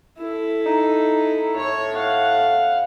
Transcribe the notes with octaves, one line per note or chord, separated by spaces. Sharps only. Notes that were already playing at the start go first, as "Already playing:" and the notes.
E4 A4
D#4
A2 C#5 C#6
F5 F#5